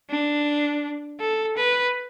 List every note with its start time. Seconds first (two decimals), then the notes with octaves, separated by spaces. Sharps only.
0.10 D4
1.20 A4
1.57 B4